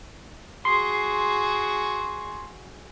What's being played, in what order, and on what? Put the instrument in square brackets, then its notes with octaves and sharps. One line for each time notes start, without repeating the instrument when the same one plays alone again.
[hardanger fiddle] F#4 G#4 [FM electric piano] C6